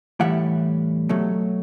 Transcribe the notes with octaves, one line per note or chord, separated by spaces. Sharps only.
A2 E3 G3 E5 F#5
B2 F#3 A3